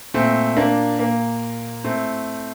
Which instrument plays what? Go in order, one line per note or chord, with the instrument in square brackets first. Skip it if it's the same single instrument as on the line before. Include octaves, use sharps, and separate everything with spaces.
[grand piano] A#2 A3 C4
A#3 D4
A#2 A#3
A2 A3 C4